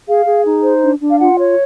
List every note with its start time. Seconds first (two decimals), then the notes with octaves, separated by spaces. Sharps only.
0.07 G#4 F5
0.26 G#4
0.45 D#4
0.63 C5
0.82 D4
1.00 D4
1.09 F5
1.19 F4 F#5
1.38 C#5